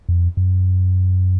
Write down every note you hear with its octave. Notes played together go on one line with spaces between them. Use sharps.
F2
F#2